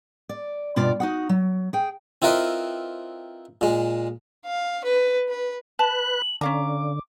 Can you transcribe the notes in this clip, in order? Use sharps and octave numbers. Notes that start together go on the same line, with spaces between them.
D5
G2 B2 F4 D5
D#4 F#4 F#5
F#3
G#4 G5
C4 E4 F4 A#4 B4 D#5
A#2 G#3
F5
B4
B4
B4 A5 F#6 F#7
D3 C#4 F5 A#5 D6